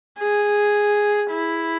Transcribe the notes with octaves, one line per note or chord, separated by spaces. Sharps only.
G#4
E4